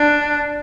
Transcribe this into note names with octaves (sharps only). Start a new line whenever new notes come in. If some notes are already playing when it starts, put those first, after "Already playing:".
Already playing: D4